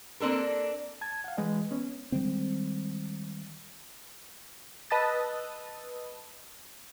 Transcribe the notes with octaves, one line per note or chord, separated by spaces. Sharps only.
A#3 C4 D4 A4 A#4
A5 G#6
F5 F#5
E3 G#3 G#4 B4 D#5
B3 C#4
D#3 G3 G#3 C4
B4 D#5 A5 D#6 E6 A6